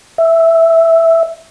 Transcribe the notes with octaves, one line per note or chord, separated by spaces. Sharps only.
E5